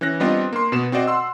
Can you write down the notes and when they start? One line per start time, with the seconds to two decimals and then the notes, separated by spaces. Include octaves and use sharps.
0.01 E3 C#4 F#6 A#6
0.20 G3 B3 C4 D4 F4 D#5
0.53 A#3 C6
0.72 B2 B3 E7
0.92 C4 F#4 C5 D5 D#5
1.08 F#5 C6 E6